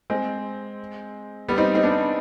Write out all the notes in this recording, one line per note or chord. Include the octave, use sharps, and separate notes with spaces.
G#3 C4
G3 B3
C4 D#4
C4 D#4
B3 D4